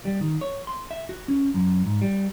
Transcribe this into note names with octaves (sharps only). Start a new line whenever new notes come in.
G3
D#3
C#5
C6
E5
F#4
C#4
F#2
G#2
G3